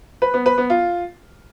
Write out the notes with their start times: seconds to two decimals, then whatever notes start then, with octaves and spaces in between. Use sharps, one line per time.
0.22 B4
0.34 B3
0.46 B4
0.58 B3
0.70 F4